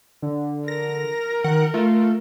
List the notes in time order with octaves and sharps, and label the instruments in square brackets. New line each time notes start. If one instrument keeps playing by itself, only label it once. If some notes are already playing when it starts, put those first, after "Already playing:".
[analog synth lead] D3
[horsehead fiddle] A#4 [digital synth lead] A#6
[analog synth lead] D#3 [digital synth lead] F#5
[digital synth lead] A3 [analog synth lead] F4